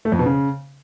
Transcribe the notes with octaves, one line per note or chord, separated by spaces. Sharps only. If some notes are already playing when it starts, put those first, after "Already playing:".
A3
F2
B2
C#3